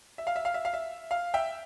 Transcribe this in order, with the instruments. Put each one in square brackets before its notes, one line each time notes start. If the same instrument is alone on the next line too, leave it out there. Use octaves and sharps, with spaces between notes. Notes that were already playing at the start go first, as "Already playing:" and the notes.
[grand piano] E5
F5
E5
F5
E5
F5
E5
F5
E5 G5